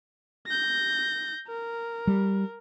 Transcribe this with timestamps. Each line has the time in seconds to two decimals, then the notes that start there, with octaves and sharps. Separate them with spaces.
0.47 G6 A#6
1.47 A#4
2.07 G3